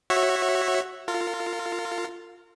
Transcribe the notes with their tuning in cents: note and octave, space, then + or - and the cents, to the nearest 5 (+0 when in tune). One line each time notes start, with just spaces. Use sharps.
F#4 +0 C#5 -20 E5 +0
F4 +0 A#4 -45